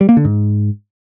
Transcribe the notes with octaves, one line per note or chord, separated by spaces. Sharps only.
G3
A#3
D3
G#2